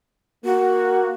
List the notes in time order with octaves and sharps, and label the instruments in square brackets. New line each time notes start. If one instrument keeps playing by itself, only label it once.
[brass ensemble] A#3 [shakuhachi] F#4